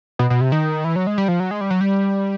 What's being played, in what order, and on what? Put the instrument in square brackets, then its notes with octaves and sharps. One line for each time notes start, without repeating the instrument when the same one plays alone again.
[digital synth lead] B2
B2
C3
D#3
E3
F#3
G#3
G3
F3
F#3
G#3
G3
F#3
G3